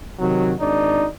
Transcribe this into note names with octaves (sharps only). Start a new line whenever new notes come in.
C3 D#3 F#3
G#1 D4 D#4 D5